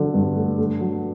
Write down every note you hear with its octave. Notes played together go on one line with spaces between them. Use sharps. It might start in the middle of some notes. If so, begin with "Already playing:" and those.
Already playing: D3 F#3
G2
A3
A3
F#3